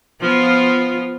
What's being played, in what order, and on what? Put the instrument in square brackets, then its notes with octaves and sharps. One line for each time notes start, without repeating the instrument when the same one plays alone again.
[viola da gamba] F3 B3 F4